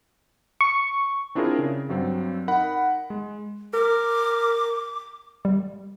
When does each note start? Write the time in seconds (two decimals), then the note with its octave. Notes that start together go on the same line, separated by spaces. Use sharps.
0.61 C#6
1.35 C4 D4 E4 F4 G#4 A#4
1.59 C#3
1.89 G2 F#3 C4
2.48 D#4 A#4 F#5 B5
3.10 G#3
3.74 A#4 D6
5.45 G3